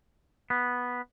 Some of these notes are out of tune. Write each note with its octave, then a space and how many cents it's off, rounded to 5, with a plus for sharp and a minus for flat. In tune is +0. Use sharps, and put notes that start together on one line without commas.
B3 -5